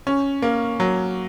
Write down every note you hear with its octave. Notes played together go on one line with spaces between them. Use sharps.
C#4
A#3
F#3